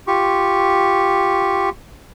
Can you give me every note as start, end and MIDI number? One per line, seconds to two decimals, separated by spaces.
0.07 1.69 65
0.07 1.69 67
0.07 1.69 85